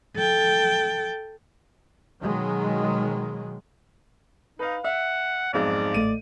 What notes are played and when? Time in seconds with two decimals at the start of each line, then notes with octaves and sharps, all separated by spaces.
0.16 A4 G5
2.22 B2 D#3 F#3 G#3
4.59 D#4 B4 F5
4.84 E5 F#5
5.53 B1 F2 G#2 D5
5.94 A1 A3 D#5 D#7